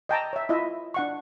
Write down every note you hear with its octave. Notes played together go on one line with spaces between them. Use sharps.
D#5 G5 A5 A#5
C#5 E5
E4 F4 D#5 E5
D4 F#5 C#6